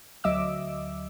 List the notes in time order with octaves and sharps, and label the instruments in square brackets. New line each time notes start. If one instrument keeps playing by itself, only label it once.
[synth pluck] D2 F#3 D#5 E5 D6 E6